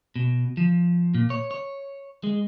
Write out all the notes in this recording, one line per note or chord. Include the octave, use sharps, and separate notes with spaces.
B2
F3
A#2
C#5
C#5
G#3